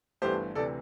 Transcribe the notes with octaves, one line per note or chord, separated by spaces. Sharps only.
G1 G2 E3 A3 G4 C5
D2 C3 E3 A4 D5